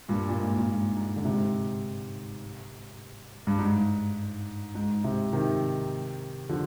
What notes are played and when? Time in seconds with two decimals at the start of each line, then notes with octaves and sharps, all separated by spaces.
0.09 G2 A#2
0.29 A#2
0.38 G#2
0.57 A#2
0.67 G#2
0.97 G#2
1.16 D3
1.25 G#2 C3
3.47 G2
3.59 G#2
4.75 G#2
5.04 G#2 C3
5.33 C3 D#3
6.49 D3 F3